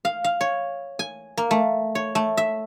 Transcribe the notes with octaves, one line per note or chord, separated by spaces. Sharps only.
F5
F5
C#5
G#5
A#3
A3
C#5
A3
E5